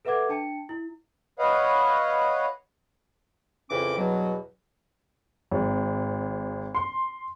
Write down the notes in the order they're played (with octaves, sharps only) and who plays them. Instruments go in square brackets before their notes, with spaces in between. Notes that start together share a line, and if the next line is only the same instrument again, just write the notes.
[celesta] A4 B4 E5 F#5 D6 G#6
D4 G5 A5 C#7
E4
[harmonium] B4 C#5 D#5 F5 F#5
[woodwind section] F2 C#3 E3 C#4 D6
E2 G2 B2 F#3
[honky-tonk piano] G#1
C6